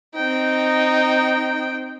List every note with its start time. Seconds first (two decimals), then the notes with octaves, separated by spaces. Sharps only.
0.15 C4 D#4 G5